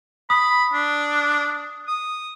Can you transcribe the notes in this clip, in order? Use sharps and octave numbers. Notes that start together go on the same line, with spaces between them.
B5 D#6
D4
D#6